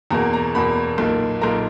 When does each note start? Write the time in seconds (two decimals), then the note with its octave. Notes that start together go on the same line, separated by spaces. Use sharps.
0.11 E2 B2 A#3 A#5
0.33 A#5
0.55 E2 B2 A#3 B5
0.98 B1 A#2 A#3
1.41 B1 A#2 A#3 A#5